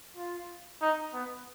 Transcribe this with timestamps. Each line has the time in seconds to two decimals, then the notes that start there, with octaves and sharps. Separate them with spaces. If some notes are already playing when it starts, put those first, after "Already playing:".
0.17 F4
0.81 D#4
1.13 B3